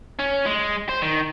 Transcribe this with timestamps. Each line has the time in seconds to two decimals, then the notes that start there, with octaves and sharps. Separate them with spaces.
0.19 C#4
0.46 G#3
0.89 C5
1.02 D#3